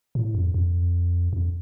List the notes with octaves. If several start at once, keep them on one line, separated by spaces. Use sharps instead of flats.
A2
F2
F2
F2